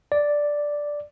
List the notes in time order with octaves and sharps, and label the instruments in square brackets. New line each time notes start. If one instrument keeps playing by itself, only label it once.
[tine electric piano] D5